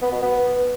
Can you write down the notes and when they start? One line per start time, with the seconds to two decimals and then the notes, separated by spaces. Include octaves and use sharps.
0.02 B3
0.12 B2
0.22 B3